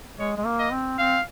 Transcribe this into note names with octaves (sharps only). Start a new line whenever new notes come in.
G#3 C#5
G#3
A#3
D#5
C4
C4 F5